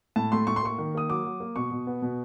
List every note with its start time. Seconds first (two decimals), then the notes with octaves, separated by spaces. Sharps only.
0.16 A2 A5
0.32 A3 C6
0.47 A2 C#6
0.56 C6
0.63 A#3 C#6
0.78 D#3
0.95 A#3 D#6
1.09 F#3 D6
1.24 F#3
1.40 A#3
1.56 B2 C#6
1.71 B2
1.87 B3
2.02 B2